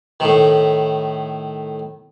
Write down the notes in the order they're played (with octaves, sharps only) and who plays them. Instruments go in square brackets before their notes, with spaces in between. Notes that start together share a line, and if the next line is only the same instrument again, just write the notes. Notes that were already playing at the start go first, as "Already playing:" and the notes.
[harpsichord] A2 D#3